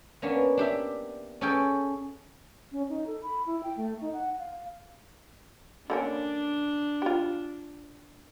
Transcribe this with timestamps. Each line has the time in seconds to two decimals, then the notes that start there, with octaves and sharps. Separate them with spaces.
0.22 A#3 B3 C#4 D4
0.57 D4 G4 E5
1.41 C#4 G#4 A4 C#5 G5
2.72 C#4
2.89 D#4
3.07 A4
3.22 B5
3.47 E4
3.63 G5
3.77 A3
4.01 D#4
4.13 F#5
4.39 F5
5.90 D3 A#3 C#4 D4
7.02 F4 G4